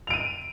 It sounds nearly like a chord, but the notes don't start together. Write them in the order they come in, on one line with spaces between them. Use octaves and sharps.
F7 D7 D#7